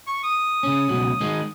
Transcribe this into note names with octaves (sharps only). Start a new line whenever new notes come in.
C#6
D#6
C#3 C#4
C#2 B2 F#3
D#3 G#3